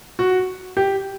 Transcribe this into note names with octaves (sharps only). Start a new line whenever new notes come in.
F#4
G4